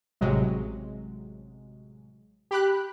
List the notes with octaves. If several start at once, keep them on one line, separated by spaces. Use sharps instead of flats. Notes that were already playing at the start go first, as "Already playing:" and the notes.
A1 C3 F#3 G#3
G4 B5 F#6